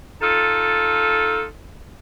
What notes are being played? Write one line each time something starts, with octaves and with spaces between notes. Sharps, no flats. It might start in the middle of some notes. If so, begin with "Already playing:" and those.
D#4 F4 A4